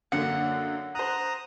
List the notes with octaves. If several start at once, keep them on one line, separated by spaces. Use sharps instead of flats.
F#2 D3 A#3 F#5
C5 A#5 D#6 F#6